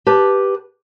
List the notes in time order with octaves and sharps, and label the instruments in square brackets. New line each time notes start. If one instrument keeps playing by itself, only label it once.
[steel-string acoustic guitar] G4 B4 A5